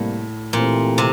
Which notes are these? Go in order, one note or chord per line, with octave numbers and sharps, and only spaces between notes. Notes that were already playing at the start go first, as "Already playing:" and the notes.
Already playing: A2 C3 G3 A#3
A#2 E3 A3 C4 G4
C3